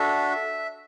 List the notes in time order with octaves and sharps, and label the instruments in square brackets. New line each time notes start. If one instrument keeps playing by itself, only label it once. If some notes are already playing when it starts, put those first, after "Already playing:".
Already playing: [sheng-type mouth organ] D4 F#4 A4 E5